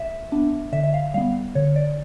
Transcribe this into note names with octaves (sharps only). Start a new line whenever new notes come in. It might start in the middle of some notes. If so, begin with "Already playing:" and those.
Already playing: E5
B3 D4
D3 E5
E5
F5
G3 B3 F5
D3 C#5
D5